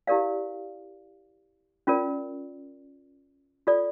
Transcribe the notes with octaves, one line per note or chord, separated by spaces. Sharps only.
E4 G4 A#4 D5 F5
C#4 F4 A#4 D5
F4 A4 D5